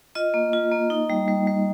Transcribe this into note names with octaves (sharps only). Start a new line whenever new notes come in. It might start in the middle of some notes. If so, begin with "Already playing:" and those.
F4 D#5
A#3
F4
A#3
D#4
G3
G3
G3